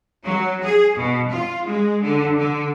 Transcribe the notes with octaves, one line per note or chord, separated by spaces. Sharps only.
F#3
G#4
B2
F4
G#3
D3
D3